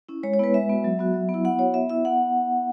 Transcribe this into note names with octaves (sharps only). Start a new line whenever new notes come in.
C#4 E4
G#3 C#5
C#5
B3 E4 B4
G#3 E5
B3 F#4
F#3
B3 F#4
F#3
B3
E4
B3 F#5
F#4 C#5
B3 E5
E4 E5
B3 F#5